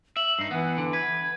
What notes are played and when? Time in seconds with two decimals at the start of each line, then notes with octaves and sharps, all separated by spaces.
0.17 E5 F#7
0.39 G2 D#4 C7
0.51 E3 B3 F#5
0.78 D3
0.93 B4 G#6